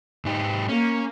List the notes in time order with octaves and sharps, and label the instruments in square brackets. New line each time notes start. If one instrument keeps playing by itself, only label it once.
[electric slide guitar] G#2 D#4 G4
[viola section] A#3 [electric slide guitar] C#4